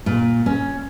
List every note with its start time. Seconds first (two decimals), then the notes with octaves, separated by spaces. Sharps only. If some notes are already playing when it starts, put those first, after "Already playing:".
0.06 A#2
0.46 C#4